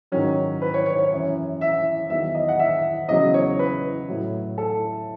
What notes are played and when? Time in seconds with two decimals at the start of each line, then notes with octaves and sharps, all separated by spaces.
0.12 G#2 D#3 F#3 C#4
0.62 B4
0.74 C#5
0.86 C#5
0.98 C#5
1.12 F#2 E3
1.61 E5
2.10 E2 D#3 F#3 E5
2.35 D#5
2.49 F#5
2.60 E5
3.09 E2 C#3 F#3 D#5
3.34 C#5
3.59 B4
4.09 A2 F#3
4.58 A4